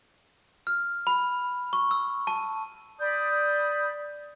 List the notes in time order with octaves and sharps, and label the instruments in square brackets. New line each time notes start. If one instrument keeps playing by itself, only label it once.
[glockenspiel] F6
B5
C#6
E6
A5
[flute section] D5 B5 D#6 G6